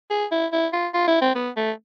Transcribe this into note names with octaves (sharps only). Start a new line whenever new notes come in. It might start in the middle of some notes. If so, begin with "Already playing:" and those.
G#4
E4
E4
F4
F4
E4
C4
B3
A3